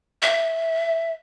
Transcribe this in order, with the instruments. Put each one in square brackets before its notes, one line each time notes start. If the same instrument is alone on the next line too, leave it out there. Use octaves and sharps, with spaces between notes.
[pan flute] E5